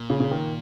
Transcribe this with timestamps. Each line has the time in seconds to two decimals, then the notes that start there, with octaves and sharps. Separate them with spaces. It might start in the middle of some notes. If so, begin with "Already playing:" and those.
Already playing: A#2
0.10 C#3
0.20 C#3
0.31 D#3